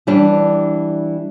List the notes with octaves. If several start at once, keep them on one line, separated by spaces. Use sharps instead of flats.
E3 G3 D4